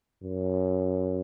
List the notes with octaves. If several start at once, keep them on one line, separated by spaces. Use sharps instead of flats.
F#2